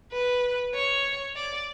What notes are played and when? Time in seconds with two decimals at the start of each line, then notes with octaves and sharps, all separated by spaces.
0.12 B4
0.74 C#5
1.35 D5